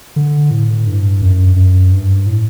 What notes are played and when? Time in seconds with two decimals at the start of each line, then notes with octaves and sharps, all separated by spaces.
0.16 D3
0.51 A2
0.87 G2
1.22 F#2
1.56 F#2
1.92 G2
2.26 A2